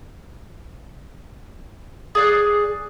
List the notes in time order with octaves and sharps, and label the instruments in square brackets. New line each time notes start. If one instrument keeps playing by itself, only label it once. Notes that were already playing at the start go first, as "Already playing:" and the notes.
[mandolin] G#4 D5 F#6